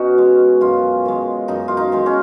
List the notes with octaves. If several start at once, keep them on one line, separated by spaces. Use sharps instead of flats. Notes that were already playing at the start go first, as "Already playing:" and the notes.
Already playing: B2 C#4 D#4 F#4
G#3
F#2 F4
D#3 G#3
F#2 D#4
F4
D#4
D#3 G#3
C#4